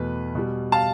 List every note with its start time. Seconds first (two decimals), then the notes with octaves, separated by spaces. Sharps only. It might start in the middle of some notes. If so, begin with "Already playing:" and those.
Already playing: E2 B2 A3 B4
0.35 B2 G3
0.72 F5 A5